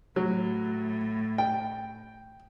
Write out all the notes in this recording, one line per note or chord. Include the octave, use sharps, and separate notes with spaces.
A2 F#3
G5